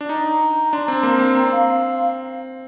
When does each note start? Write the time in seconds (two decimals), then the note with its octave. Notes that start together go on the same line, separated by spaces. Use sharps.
0.01 D4
0.09 D#4 A#5
0.73 D4 C6
0.86 C4 A#5
0.99 A#3 C6
1.19 C4
1.35 C4 A#5
1.51 F5